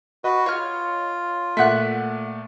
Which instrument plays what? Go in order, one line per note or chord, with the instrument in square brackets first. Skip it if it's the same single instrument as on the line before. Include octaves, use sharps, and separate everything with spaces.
[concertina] F#4 B4 [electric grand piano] D#5
[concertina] F4 [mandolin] C#5 F6
[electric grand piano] A#2 A3 [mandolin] E5 F#5 F#6